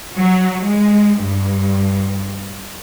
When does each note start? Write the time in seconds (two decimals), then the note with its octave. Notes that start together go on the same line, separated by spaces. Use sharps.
0.16 F#3
0.64 G#3
1.20 G2